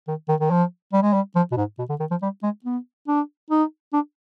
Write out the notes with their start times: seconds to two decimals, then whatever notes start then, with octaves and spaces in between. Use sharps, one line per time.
0.08 D#3
0.28 D#3
0.40 D#3
0.50 F3
0.93 G3
1.02 G#3
1.13 G3
1.35 F3
1.52 B2
1.57 G#2
1.79 B2
1.89 D3
2.00 D#3
2.11 F3
2.22 G3
2.43 G#3
2.64 B3
3.08 D4
3.51 D#4
3.93 D4